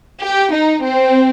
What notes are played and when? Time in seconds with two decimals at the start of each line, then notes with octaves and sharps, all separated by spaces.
0.22 G4
0.52 D#4
0.83 C4